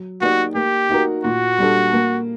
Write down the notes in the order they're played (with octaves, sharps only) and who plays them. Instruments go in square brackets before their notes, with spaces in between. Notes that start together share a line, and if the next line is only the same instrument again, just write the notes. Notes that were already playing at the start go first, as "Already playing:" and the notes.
Already playing: [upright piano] F#3
[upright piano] A#3 D#4 G4 D5 [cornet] F#4
[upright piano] A#3 [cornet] G4
[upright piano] D#4 F#4 A#4
[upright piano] A#2 [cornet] F#4
[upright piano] G3 D4 A4
A#3